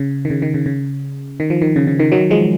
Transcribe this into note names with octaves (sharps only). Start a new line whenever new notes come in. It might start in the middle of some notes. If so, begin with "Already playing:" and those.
Already playing: C#3
D#3
C#3
D#3
C#3
C#3
D#3
F3
D#3
C#3
C#3
D#3
D#3 F#3
F3 G#3